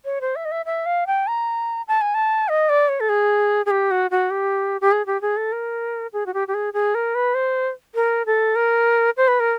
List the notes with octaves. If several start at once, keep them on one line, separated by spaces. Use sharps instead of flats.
C#5
C5
E5
D#5
E5
E5
F5
G5
A#5
A5
G#5
A5
D#5
D5
C#5
A4
G#4
G#4
G4
F#4
F#4
G4
G4
G#4
G4
G#4
A4
A#4
G#4
F#4
G4
G4
G#4
G#4
A#4
B4
C5
A#4
A4
A#4
C5
B4
A#4